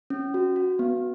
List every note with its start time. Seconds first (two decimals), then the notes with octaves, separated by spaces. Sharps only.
0.10 C#4
0.34 F#4
0.56 F#4
0.79 B3